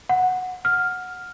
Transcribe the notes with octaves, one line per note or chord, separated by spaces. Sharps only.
F#5
F6